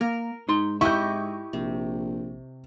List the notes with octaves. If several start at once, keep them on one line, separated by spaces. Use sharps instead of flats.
A#3 A#4
G#2 D#4 C6
E4 G4 D#5 E5 C#6 G6
A#1 C3